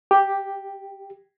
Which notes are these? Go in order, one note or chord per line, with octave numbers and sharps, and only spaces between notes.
G4